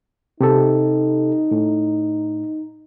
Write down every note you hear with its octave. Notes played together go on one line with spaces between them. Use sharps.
C3 D#4 G4 A4
A2